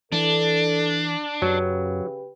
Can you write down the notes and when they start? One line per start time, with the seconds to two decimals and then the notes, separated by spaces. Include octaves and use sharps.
0.12 E3 D4 A4
1.42 F#2 C#3 F#3 G4 B4